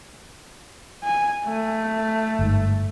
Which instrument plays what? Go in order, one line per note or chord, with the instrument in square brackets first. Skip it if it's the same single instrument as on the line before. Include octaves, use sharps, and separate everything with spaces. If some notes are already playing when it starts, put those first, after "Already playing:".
[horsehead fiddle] G#5
A3
[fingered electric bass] G1 G#2